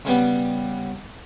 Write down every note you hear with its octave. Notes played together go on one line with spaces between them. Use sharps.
C#3 G3 B3